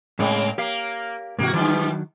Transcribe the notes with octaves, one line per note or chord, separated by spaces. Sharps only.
A2 C#3 G#3 A#3 C4
A#3 G4 F5
G#2 C3 E3 A#3 F#4
G2 D#3 E3 F#3 D4